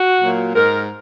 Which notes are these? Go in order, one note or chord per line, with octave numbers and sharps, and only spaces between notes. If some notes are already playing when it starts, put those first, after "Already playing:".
Already playing: F#4
A#2 F#3 A#3
G#2 G#3 A#4